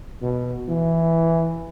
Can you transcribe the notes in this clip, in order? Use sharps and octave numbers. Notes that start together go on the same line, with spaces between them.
B2
E3